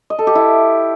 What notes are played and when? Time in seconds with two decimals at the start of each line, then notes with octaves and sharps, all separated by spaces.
0.10 D#5
0.19 A4
0.27 G4
0.35 E4